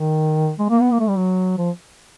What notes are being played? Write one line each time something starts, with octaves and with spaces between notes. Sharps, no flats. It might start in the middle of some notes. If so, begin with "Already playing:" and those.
Already playing: D#3
G#3
A#3
B3
A#3
A3
G3
F#3
F3